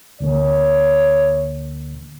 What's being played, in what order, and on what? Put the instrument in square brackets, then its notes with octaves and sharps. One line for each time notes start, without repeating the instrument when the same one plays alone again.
[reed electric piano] D2 D3 A#3 [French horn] C#5